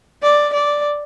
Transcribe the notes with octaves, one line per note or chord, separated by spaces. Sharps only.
D5
D5